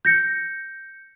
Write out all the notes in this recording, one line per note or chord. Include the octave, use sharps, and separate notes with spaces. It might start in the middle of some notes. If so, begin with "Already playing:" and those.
G6 A#6 C#7